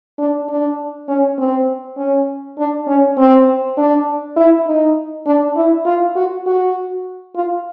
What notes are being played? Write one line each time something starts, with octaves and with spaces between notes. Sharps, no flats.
D4
D4
C#4
C4
C#4
D4
C#4
C4
D4
E4
D#4
D4
E4
F4
F#4
F#4
F4